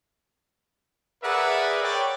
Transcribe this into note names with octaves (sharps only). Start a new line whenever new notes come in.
G#4 A#4 B4 D5 E5 F#5
C#5 D5 G5